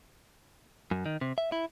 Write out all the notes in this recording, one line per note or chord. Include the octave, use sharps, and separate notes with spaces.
F#2
D#3
C3
E5
E4